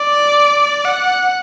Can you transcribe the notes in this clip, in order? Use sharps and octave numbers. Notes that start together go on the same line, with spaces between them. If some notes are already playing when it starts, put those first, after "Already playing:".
Already playing: D5
F#5